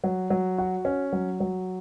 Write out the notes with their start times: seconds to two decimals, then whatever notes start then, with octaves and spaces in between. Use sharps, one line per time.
0.04 F#3
0.30 F#3
0.58 F#4
0.85 C#4
1.13 F#3
1.40 F#3